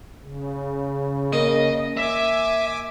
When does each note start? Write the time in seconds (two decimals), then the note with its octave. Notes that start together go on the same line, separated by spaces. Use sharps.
0.24 C#3
1.33 A#3 D#5
1.97 E5 G#5 D6